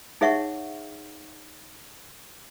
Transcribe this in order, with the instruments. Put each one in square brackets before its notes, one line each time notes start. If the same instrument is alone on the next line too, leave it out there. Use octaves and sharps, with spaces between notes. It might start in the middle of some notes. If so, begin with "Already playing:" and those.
[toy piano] D#4 G#4 C#5 E5 F#5 C#6